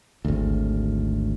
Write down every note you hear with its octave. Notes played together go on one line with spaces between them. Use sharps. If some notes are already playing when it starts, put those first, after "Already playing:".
G#1 D2